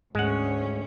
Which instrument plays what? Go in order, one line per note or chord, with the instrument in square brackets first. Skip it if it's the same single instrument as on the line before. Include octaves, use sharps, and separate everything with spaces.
[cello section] D2 C#4 [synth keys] G#2 [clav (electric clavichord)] G#3 F#5